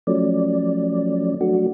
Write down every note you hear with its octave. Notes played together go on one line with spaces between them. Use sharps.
F3 F#3 A3 C#4 D5
F#3 A3 D4 F#4